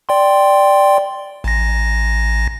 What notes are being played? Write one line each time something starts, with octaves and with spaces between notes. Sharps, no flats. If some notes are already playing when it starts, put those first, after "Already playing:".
D5 G5 C6
A1 A#6